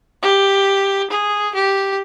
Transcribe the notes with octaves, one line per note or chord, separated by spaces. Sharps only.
G4
G#4
G4